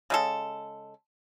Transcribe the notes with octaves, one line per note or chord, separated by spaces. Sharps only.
C#3 G#3 A4